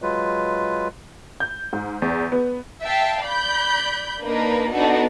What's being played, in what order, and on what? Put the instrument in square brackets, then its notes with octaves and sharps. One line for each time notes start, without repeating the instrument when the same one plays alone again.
[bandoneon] F#3 G#3 F4 B4
[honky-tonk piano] G6
G#2
E2
B3
[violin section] E5 F5 G5 A5
D5 B5 G6
A#3 D4 D#4 A#4 B4
B3 D4 D#4 F#4 A4